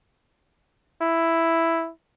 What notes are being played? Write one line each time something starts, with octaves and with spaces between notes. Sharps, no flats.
E4